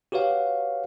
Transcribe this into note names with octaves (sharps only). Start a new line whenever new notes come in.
F#4 G4 B4 C#5 F5 F#5